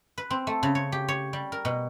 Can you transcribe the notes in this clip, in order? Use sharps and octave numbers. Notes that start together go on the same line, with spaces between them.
B4
C4
A3
C#3
C#5
G4
C#5
G3
A#4
B2